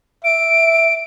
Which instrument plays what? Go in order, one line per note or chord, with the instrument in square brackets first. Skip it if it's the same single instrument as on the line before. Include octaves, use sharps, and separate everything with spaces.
[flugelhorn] E5 [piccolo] D7